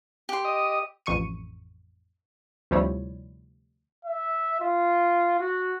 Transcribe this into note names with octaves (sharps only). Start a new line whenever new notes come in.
G4 C6
D#5 D#6
A1 F2 C#6 C#7 D#7
D2 C3 F3 G3 E4 C#5
E5
F4
F#4